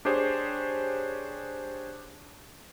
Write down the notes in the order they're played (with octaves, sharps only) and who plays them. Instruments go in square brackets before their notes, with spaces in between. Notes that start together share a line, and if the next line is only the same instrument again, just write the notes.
[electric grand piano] D4 G4 G#4 C5 C#5